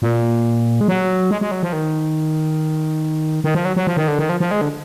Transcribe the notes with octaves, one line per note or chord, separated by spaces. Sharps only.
A#2
G#3
F#3
G#3
G#3
F#3
F3
D#3
D#3
F3
F#3
F#3
F3
D#3
D3
D#3
F3
F3
G#3
D3